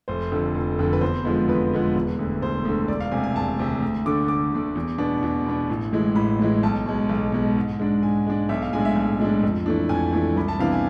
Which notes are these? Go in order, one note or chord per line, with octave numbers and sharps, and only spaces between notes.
F1 C5
F2 D3
F1
F2 D3
B4
E2 C5
D3 F3 G#3 B3
E2 B4
D3 F3 G#3 B3
E1
D2 D3
E1 C5
D2 D3
E1 D5
F5
D2 C3 G#5
G#5
E1 A5
D2 C3
D2
D3 A3 D4 D6
D2 D6
D3 A3 D4
E2
B2 B3 D4
E2
B2 B3 D4
A1
A2 E3 G#3
A1 B5
A2 E3 G#3
B1 A5
B2 G#3
B1
B2 G#3
G#2
G#3 D4
G#2 G#5
G#3 D4
B1 E5
F5
A2 G#3 D4 G#5
E5
B1
A2 G#3 D4
F2
E3 A3 D4
F2 G#5
E3 A3 D4
C2 B5
A5
C3 E3 B3 D4 F5
G#5